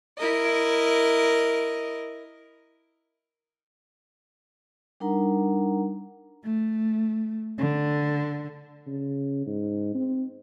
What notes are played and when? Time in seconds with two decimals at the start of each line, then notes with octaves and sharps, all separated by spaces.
0.17 E4 A#4 D#5
5.00 G3 D4 D#4 A#4 F#5 A#5
6.44 A3
7.58 D3
8.87 C#3
9.47 G#2
9.95 C4